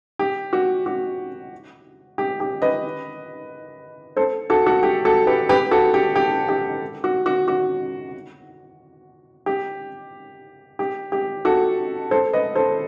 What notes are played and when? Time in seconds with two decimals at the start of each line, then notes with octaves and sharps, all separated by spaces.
0.19 G4
0.53 F#4
0.86 F#4
2.18 G4
2.40 G4
2.62 B4 D#5
4.17 A4 C5
4.50 F#4 A4
4.66 F#4 A4
4.83 G4
5.05 F#4 A4
5.27 G4 B4
5.49 G4 B4
5.71 F#4 A4
5.94 G4
6.16 G4
6.49 G4
7.04 F#4
7.26 F#4
7.48 F#4
9.46 G4
10.79 G4
11.12 G4
11.45 F#4 A4
12.11 A4 C5
12.33 B4 D#5
12.55 A4 C5